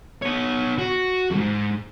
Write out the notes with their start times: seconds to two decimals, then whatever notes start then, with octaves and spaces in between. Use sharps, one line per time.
0.22 B3 C#5
0.78 F#4
1.31 F2 G#2